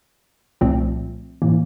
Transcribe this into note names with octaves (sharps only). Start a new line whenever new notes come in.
C2 A#2 F3 A3 C4
A2 E3 A#3